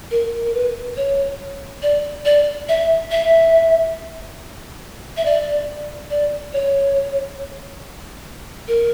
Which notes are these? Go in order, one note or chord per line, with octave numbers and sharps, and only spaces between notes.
A#4
A#4
B4
C#5
D5
D5
E5
E5
E5
D5
D5
C#5
A#4